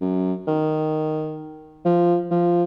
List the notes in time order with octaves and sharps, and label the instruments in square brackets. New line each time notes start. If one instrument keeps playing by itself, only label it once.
[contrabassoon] F#2
D#3
F3
F3